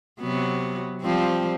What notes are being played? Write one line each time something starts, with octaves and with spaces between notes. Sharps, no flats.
C3 F#3 B3
F3 G3 C4